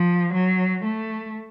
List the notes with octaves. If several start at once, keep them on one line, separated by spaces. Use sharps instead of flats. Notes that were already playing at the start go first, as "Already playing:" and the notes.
Already playing: F3
F#3
A3